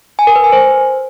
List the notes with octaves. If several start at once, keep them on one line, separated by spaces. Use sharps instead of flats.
G#5
A#4
B4
G#5
C5